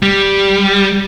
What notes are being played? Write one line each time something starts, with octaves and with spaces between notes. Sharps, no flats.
G3